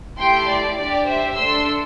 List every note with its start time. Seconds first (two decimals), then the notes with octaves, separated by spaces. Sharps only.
0.19 A3 E4 G4 G5 C6
0.49 D5
0.77 D4 G4 D5
1.07 C5 E5
1.37 A3 D4 A4 C6 E6